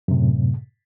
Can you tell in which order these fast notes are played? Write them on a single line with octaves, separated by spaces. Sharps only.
F#2 C3 A2